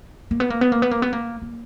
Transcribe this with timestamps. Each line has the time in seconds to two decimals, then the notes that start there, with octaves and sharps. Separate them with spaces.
0.31 A#3
0.40 B3
0.50 A#3
0.61 B3
0.72 A#3
0.82 B3
0.91 A#3
1.02 B3
1.13 A#3
1.42 A#3